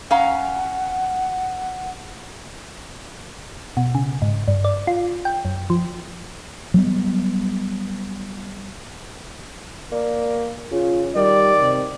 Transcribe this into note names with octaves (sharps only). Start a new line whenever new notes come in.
C#4 F5 F#5 A#5
B2
C#3
G#2
G2
D5
F4
G5
F#2
F3
F#3 G3 B3
A#3 D5
C#3 F4
D#3 G3 D5
C3